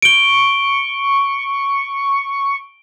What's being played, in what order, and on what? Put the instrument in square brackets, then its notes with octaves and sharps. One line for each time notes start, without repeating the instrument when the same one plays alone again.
[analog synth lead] C#6 [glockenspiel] D7 G7